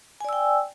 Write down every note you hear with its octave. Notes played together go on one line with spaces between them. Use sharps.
D5 G5 G#5 E6